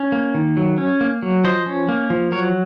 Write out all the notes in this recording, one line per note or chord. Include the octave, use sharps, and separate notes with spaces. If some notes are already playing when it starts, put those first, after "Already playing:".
Already playing: C#4
A#3
D#3
F#3
C#4
A#3
F#3
F3 C5 D#5
C#4
A#3
F3
F#3 A#4 C#5